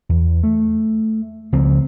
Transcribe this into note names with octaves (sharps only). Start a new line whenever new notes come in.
E2
A3
C#2 F3 C4